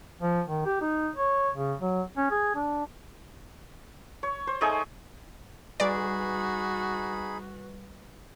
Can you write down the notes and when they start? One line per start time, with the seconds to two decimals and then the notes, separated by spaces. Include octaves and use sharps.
0.22 F3
0.48 D#3
0.66 G4
0.81 D#4
1.16 C#5
1.55 C#3
1.80 F#3
2.17 C#4
2.31 G#4
2.55 D4
4.23 C#5
4.47 C5
4.61 A3 D#4 G#4 G#5
5.80 G3 D#4 F#4 G#4 B4 D5 B5